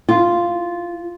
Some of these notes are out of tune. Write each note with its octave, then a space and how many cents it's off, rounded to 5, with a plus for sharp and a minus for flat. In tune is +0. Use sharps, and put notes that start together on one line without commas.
F4 -5